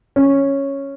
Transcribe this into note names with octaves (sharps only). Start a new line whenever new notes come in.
C#4